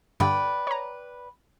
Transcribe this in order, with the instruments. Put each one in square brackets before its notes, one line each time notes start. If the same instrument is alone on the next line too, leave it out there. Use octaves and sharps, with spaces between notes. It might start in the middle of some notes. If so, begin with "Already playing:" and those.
[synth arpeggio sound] G2 D3 [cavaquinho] B4 D5 G5
[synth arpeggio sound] C#5 A#5